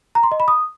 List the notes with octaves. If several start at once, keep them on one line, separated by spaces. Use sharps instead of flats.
A#5
C6
D#5
B5
D#6